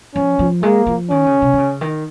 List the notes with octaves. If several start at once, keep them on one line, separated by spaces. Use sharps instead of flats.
F3 C#4
F3
G#3 A#3
F3
D#3 C#4
C#3
C3
D#3
C#3
D#3